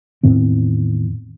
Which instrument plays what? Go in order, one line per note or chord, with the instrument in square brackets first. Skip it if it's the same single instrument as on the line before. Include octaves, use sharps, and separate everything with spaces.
[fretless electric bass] E2 A2 D#3 C4